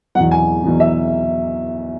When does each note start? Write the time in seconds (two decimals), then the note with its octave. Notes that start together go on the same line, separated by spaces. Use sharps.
0.15 E2 B2 F#3 F#5
0.31 G#5
0.64 E2 B2 F#3
0.80 E5